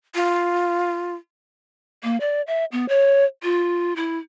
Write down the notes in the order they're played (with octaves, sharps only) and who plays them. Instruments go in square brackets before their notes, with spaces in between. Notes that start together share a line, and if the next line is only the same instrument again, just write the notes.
[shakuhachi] F4
[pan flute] A#3
D5
E5
B3
C#5
F4
E4